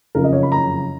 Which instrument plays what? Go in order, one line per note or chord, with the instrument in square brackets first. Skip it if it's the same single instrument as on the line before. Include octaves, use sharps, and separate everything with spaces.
[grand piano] F#1 F2 C#3 A#4
D#5
C#5
B5
F#1 F2 C#3 A#5